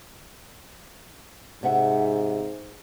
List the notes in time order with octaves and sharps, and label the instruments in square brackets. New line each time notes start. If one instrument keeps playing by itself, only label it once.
[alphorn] G#2 [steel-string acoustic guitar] C3 E5 F#5